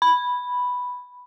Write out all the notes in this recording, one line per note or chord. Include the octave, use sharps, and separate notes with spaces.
B5